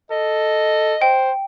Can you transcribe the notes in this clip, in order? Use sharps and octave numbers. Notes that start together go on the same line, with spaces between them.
A4 D#5
C5 G5